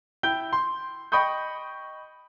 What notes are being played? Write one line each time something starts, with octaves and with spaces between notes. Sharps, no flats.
E4 G5 G6 G7
C6
D#5 G5 B5 C#6 D#6 G6